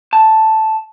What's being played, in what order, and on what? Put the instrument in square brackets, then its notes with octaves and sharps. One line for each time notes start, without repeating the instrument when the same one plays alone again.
[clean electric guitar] A5